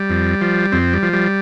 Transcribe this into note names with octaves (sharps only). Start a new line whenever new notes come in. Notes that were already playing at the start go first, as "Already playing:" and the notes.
Already playing: G3
F2
F3
F2 C4
G3
F3
G3